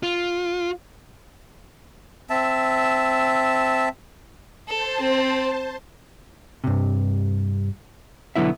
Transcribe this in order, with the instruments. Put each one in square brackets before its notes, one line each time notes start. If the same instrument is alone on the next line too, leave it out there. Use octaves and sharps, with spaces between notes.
[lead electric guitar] F4
[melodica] C4 E5 A5
[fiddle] A4 [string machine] C5 A5
[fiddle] C4
[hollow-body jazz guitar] G2 C3
B1 D3 F#3 B3 E4 E5